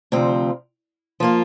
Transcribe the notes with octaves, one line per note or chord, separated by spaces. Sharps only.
D2 C3 F3 C4
F3 A#3 F4